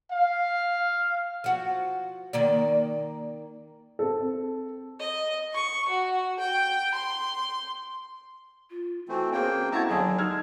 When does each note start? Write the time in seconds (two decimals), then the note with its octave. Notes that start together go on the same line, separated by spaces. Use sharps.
0.11 F5
1.44 F3 F#4
2.33 D#3 A#3 D5
3.99 C4 A4
5.00 D#5
5.53 C#6
5.89 F#4
6.40 G5
6.95 C6
8.70 F4
9.09 E3 A3 C4 F#4
9.32 A#3 C4 C#4 G#4 G5
9.72 A3 E4 F#4 F#5 A5 A#5 G#6
9.89 D#2 D3 F#3 D4 G#4 A4
10.18 G#3 D#4 E6 F6 G#6